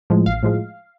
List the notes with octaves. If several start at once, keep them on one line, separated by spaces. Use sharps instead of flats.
A2 F3 G#3
A1 F5
A2 F3 G#3